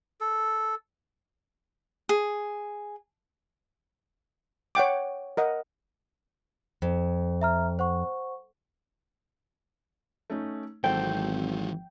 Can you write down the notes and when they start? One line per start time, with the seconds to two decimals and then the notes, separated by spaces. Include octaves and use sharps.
0.21 A4
2.09 G#4
4.75 C#5 F#5 G5 D6
5.37 A#4 D#5 F#5
6.82 F2
7.41 E5 A#5 F6
7.79 C5 F#5 C#6
10.30 A3 C#4 D#4
10.84 G#1 E3 F#3 C4 A4 C5 G5